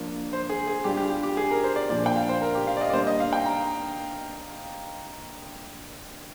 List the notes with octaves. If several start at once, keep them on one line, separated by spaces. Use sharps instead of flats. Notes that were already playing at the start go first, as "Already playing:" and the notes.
Already playing: F3 A#3 D4 F4
C5
G#4
G#4
G3 D4 F4 G4
G4
G4
G4
G#4
A#4
C5
D5
A#2 F3 A#3 D4 D5
G5
F5
C5
A#4
G4
F5
D5
D#5
D5
G3 A#3 D4 C5
D#5
F5
G5
A#5